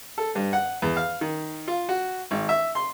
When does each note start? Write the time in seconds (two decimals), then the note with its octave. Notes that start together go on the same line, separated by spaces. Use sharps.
0.18 A4
0.35 G2
0.53 F#5
0.82 E2
0.97 F5
1.21 D#3
1.68 F4
1.89 F#4
2.31 G#1
2.49 E5
2.75 C6